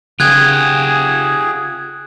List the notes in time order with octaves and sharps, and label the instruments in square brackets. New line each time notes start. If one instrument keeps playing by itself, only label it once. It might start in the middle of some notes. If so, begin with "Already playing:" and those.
[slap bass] C#3 [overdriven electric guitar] F4 G4 [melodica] G#4 [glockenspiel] F#6 G#6